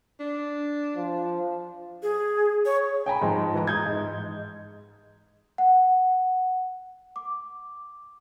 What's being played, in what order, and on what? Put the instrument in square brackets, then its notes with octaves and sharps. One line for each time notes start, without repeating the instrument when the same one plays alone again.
[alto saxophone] D4
[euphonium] F3
[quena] G#4
C#5
[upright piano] G5 G#5 A#5 B5
G#2 F3 G#3 D#4
E3 A#5
D#6 G6 G#6
G#2
[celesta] F#5
D6